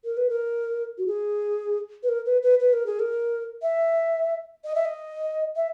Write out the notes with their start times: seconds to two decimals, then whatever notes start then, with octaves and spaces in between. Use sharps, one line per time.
0.04 A#4
0.17 B4
0.30 A#4
0.98 F#4
1.07 G#4
2.03 B4
2.09 A#4
2.26 B4
2.43 B4
2.60 B4
2.73 A#4
2.86 G#4
3.00 A#4
3.62 E5
4.64 D#5
4.75 E5
4.85 D#5
5.56 E5